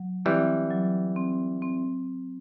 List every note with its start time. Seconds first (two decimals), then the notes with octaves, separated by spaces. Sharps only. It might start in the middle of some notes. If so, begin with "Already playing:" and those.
Already playing: F#3
0.25 E3 G3 C4
0.70 F#3
1.16 C4
1.62 C4